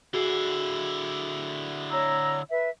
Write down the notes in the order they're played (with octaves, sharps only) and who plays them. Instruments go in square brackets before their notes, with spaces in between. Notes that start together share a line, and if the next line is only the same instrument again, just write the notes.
[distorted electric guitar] D3 E4 [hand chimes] F#4 G#4 C7
[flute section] C#5 A#5 E6
B4 E5